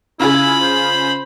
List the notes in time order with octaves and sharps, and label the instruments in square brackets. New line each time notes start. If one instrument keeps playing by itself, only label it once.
[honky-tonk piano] C#3 F4 G#4 [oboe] E4 [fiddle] B5
[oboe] C5